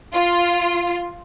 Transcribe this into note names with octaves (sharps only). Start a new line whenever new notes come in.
F4